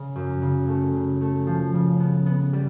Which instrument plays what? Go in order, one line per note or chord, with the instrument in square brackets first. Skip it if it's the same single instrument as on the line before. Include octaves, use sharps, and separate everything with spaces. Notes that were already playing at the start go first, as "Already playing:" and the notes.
Already playing: [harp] C#3
F#2
C#3
A3
C#3
A3
F3
C#3
B3
B3
G3